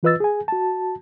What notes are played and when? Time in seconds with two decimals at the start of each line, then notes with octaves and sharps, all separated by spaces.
0.03 E3 F4 B4 D#5 E6 A6
0.20 G#4 G#5
0.48 F#4 A5